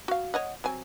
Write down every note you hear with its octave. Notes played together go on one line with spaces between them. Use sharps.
F#4 F5
C#5 D#5 F#5
F#3 C4 G#5